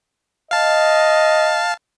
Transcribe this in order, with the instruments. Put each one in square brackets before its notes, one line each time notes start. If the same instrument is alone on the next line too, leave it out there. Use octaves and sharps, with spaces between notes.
[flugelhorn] D#5 [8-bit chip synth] F5 A5